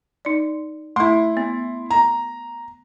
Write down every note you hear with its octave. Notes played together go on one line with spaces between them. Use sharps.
D#4 D5
A3 E4 C6
B3
A#5